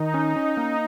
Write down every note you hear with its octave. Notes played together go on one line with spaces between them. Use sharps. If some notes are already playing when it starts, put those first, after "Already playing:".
Already playing: D#3 D#4
C#4
C#4
A#3